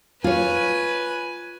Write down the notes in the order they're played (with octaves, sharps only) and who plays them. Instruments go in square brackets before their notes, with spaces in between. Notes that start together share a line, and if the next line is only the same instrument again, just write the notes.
[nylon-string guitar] F4 C#5 [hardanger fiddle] B4 G#5